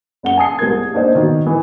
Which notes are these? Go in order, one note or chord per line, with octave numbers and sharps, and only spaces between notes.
F#1 F#5 G7
G#5 A5 D#6 C7
C2 G#2 A#4 G#6
A#3 D4 D#4 C5 D#5
B2 D#3
E3